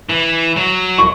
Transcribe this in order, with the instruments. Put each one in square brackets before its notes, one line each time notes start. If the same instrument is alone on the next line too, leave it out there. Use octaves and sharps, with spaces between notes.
[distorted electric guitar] E3
F#3
[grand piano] C#6